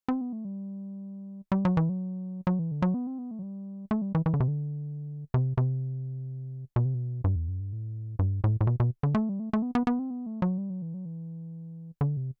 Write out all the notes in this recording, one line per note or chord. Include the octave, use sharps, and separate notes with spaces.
C4
B3
A3
G3
G3
F#3
E3
F#3
F#3
E3
D3
F#3
B3
C4
B3
A3
F#3
G3
A3
G3
E3
E3
D3
C3
D3
C3
C3
B2
C3
B2
G2
E2
F#2
G2
A2
G2
A2
A2
B2
B2
D3
A3
G3
A3
A3
B3
B3
B3
C4
B3
A3
F#3
G3
F#3
E3
F#3
E3
D3
C3